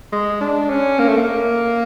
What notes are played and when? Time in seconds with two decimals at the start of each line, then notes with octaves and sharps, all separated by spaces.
0.13 G#3
0.41 D4
0.70 C#4
0.99 A#3
1.08 A3
1.17 A#3